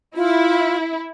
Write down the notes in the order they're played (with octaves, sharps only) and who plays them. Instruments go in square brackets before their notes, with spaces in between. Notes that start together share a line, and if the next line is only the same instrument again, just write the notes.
[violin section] E4 [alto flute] F4